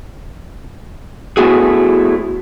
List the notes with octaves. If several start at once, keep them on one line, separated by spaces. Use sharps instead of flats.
A3 B3 E4 F#4 G#4